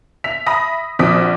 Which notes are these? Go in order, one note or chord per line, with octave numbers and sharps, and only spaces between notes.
E5 B6 F7
E5 B5 D#6 A#6
A#1 C4 F#4 D6 D#6 B6